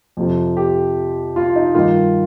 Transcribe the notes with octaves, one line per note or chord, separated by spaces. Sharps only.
F2 C3 F3
G4
F4
D#4
G2 D#3 F4